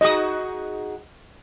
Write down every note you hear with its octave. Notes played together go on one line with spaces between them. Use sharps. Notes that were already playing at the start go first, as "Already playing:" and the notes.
D#4 F#4 G#4 D#5 D#6